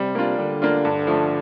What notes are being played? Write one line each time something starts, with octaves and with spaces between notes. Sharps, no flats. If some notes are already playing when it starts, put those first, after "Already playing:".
Already playing: C3 G3
A#3 D4 F4
D3 G3
A#3 D4 F4
G2
F3 A3